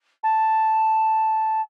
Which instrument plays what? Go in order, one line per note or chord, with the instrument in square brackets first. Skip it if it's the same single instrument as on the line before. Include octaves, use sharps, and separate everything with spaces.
[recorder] A5